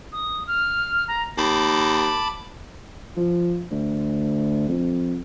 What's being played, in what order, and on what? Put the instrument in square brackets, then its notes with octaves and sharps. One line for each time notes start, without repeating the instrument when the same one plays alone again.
[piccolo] D#6
F6
A#5
[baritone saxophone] D#2 [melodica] A5 B5 D6
[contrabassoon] F3
D2
F2